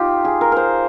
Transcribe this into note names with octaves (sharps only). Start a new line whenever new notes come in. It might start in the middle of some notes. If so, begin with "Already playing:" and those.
Already playing: D#4 F4 G4
G#4
A#4
A#4 C5